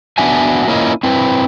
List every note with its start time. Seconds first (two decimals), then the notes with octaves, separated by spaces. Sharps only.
0.18 B3 D4 F#4 E5 G#5
0.68 A#3 C#4 E4 F4 D#5
1.03 C4 E4 B4